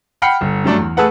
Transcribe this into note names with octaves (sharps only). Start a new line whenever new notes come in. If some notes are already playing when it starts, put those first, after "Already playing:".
F#5 G5 B5 F6 C7 C#7
G1
G2 F#3 A3 D4
E2
A3 G#4 A4 B4 F#5